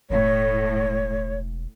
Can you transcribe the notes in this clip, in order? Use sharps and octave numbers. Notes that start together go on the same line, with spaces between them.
E1 A2 C#5